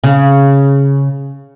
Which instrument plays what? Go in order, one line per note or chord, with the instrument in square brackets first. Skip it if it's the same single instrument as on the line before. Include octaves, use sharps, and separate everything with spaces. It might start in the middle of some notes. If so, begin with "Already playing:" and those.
[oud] C#3